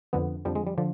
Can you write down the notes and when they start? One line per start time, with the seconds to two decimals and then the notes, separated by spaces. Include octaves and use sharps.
0.13 F2 D3 F3 B3
0.45 F2 D3 F3 G3
0.55 G#3
0.67 G3
0.78 D3 F3